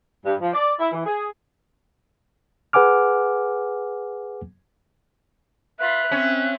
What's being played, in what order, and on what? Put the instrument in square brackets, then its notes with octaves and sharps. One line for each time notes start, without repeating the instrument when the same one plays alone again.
[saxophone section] G2
F3
D5
E4
E3
G#4
[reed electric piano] G#4 B4 F#5 G#5 D6 F6
[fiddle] F4 B4 [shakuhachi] E5 [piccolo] F#6
[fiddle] C4 [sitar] C#4